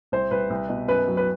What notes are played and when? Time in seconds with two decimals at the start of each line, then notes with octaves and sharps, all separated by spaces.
0.12 C2 C5
0.31 C2 B4
0.50 C2
0.69 B2
0.88 F#2 B4
1.07 F#3
1.17 B4